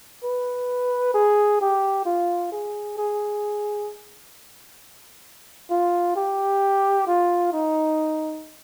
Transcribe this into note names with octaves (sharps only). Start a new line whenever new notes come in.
B4
G#4
G4
F4
G#4
G#4
F4
G4
F4
D#4